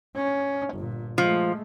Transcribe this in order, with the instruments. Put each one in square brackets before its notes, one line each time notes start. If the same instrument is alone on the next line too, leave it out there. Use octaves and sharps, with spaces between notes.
[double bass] C#4
G1 A#2
[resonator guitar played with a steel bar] F3 [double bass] G#3 A3